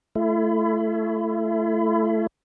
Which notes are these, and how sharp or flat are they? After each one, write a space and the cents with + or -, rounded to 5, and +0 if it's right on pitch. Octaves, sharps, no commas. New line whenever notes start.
A3 -5 E4 +35